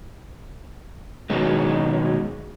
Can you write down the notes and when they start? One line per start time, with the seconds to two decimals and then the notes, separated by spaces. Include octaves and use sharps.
1.30 B2 D#3 F#3 G#3